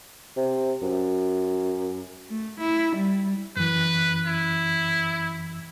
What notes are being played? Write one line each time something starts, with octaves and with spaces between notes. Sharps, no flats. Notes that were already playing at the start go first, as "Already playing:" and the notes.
C3
F#2
A3
E4
G3
F#2 E3 B4
E4